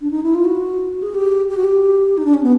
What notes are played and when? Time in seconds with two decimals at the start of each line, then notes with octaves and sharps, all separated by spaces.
0.01 D4
0.11 D#4
0.23 E4
0.35 F4
0.45 F#4
1.02 G#4
1.14 G4
1.49 G4
1.57 F#4
1.64 G4
2.18 D#4
2.25 D4
2.34 C#4
2.43 B3